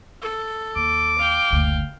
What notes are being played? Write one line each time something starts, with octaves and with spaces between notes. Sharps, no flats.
A4
D#2 D6
F5 G5
F#1 D2